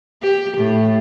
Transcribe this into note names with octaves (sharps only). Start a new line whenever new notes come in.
G4
A2